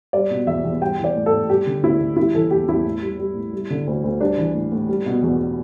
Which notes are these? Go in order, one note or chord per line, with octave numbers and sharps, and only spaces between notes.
G3 D5
B2
E2 E5
E2
G3 G5
E3
D5
A2
A4
A2
G3 G4
D3
D2 E4
D2
G3 E4
E3 A4
E2 G4
E2 E4
A2
G3
G3
A2
G3
D3
D2
D2
G3 D4
E3
A2
A2
G3
B2
E2